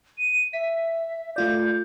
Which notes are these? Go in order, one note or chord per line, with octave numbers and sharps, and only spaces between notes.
D#7
E5 B6
A3 F4 D5 G6